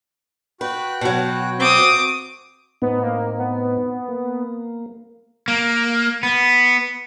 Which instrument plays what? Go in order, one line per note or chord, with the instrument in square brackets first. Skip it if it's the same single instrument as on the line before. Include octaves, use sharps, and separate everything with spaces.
[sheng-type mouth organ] F#4 G5 F#6 [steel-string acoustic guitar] B4
[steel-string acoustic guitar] B2 F#3
[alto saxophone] C4 [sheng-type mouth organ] F#4 [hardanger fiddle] D6 D#6
[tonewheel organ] A2 C4 D#4 [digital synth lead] B3
[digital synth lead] A#3
B3
[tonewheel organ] A#3
[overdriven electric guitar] A#3
B3